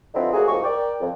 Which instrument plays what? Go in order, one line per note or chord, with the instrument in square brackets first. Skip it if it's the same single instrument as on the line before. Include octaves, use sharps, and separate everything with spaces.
[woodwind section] D3 F3 B3 C4 D#4 E4
C3 A3 A#3 F#4 G#4
C2 F2 G#2 A#3 C#6
A#4 D5 G5
F2